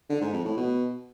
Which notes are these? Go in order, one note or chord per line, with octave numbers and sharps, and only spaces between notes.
D3
G#2
F2
A2
B2